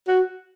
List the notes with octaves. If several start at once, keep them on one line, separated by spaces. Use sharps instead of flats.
F#4